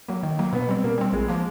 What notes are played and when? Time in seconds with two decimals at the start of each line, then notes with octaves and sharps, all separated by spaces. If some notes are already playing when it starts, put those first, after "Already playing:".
0.09 F#3 A#3
0.23 D#3
0.39 F#3 A#3
0.53 B2 B3
0.69 G3 C4
0.84 B2 A#3
0.98 G3 C4
1.13 A#1 G#3
1.28 F3 A#3